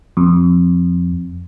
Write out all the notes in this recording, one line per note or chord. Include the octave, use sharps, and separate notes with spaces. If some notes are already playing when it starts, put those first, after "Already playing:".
F2